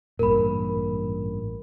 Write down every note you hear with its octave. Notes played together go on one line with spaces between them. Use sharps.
A1 G2 A#2 A#4 B5